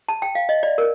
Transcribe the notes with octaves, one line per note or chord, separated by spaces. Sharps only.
A5
G5
F5
D#5
D5
A#4